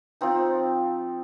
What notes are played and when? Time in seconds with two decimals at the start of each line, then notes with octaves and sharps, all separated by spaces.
0.21 F3 C4 D#4